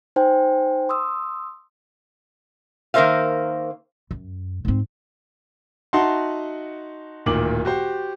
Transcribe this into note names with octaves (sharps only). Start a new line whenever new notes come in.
D#4 C5 G5 G#5
C6 D#6 E6
D#3 A#3 A#4 C5 E5 F5
F#2
G#2 C4
D#4 F#4 E5 F#5 A5 C6
D1 A#2 D#3 D6 F#7
F#4 G4 C5